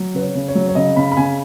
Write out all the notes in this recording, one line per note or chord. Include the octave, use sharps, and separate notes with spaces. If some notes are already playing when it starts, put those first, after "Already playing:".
Already playing: F#3
C#3 B4
C#5
C#3
C#5
F#3
C#5
C#3 D#5
C#3 B5
B5
C#3 G#5